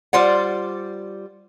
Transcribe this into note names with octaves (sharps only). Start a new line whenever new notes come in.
G3 F4 C5 D5 F#5